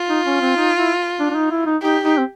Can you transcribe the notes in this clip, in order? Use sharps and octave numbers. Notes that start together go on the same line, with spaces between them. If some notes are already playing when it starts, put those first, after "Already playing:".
Already playing: F4
D#4
C#4
C4
D#4
E4
D4
D4
D#4
E4
D#4
D#4 G4
D#4
C4